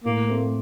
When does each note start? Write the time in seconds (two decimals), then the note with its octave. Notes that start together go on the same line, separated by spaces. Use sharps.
0.04 A2 A#3
0.29 A3 C4